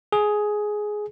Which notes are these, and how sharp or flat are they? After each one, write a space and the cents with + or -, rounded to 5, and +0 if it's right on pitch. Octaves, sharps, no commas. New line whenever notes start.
G#4 +10